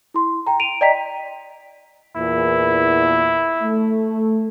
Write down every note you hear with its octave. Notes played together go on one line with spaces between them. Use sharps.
E4 C6
G5 A#5
D7 D#7 F7
D5 D#5 G5 A#5 B6
E2 A#2 E4
A3